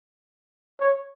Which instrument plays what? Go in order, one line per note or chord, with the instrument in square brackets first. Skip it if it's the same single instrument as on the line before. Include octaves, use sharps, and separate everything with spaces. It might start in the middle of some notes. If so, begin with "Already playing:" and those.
[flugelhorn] C#5